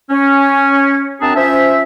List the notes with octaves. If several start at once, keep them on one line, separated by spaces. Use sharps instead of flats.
C#4
F#2 C4 D4 G#4 A5 A#5
F3 C#4 C5 E5